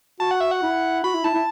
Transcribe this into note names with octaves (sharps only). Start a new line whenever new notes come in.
F#4 A5
F#5
E5
F#5
E4
F#4 B5
E4
E4 A5
E4